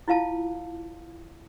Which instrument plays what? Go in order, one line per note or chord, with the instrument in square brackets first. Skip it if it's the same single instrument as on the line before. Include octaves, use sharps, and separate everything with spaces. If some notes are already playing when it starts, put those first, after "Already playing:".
[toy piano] E4 F4 F5 A5